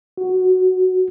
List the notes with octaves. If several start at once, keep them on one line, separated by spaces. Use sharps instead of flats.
F#4